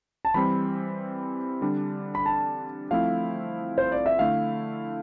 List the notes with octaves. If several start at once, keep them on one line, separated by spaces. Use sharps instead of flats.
A5
E3 G3 C4 B5
D3 G3 D4
B5
A5
F3 A3 C4 E4 F5
C5
D5
E5
D3 A3 E4 F5